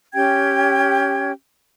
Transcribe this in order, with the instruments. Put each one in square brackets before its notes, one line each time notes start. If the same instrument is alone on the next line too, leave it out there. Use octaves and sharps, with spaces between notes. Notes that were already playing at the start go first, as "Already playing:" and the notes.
[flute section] C#4 G4 G5 G#6